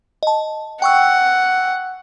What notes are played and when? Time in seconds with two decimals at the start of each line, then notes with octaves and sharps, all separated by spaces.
0.23 D#5 A5
0.82 F#5 G5 C#6 E6